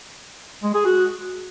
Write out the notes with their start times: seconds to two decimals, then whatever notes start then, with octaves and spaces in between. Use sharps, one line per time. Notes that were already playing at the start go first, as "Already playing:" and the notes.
0.63 G#3
0.74 G#4
0.86 F#4